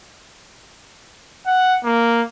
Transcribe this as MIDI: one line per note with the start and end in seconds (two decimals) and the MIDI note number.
1.46 1.78 78
1.84 2.22 58